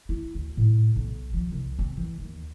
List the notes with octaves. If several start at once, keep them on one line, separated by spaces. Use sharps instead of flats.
E4
D2
A2
B1
F3
C2
C4
E3
D#2